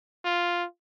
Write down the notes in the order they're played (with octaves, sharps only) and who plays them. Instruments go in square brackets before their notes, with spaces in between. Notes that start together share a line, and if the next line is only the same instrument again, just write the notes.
[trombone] F4